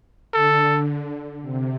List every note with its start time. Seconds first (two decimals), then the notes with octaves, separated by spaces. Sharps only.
0.34 D3 A4
1.42 C3